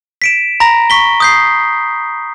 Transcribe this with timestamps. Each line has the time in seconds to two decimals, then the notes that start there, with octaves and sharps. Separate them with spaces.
0.22 B6 D7 E7
0.60 A#5 B5 A#6
0.90 C#6 B6 G7
1.20 D#6 G6 C7